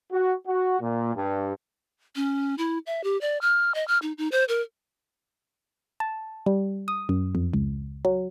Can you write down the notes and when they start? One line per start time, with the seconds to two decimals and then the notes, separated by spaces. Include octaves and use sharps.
0.11 F#4
0.46 F#4
0.81 A#2
1.15 G2
2.16 C#4
2.58 E4
2.87 E5
3.04 G4
3.21 D5
3.41 F6
3.75 D#5
3.88 F6
4.02 D#4
4.18 D#4
4.32 C5
4.49 A#4
6.00 A5
6.46 G3
6.88 D#6
7.09 F#2
7.35 F2
7.53 C#2
8.05 F#3